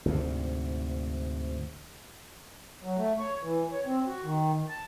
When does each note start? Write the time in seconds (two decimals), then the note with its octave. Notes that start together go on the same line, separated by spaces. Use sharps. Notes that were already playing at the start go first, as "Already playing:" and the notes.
0.05 D2 G#2 C3
2.83 F#3
2.97 A3
3.18 C#5
3.43 E3
3.72 C#5
3.86 C4
4.07 F#4
4.24 D#3
4.69 A5